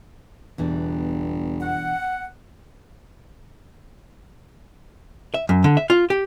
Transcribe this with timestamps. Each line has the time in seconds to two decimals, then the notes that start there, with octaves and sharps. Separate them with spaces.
0.58 G1 E2 B2 E3 D4
1.60 F#5
5.34 E5
5.49 F#2
5.64 D3
5.77 E5
5.90 F4
6.10 G4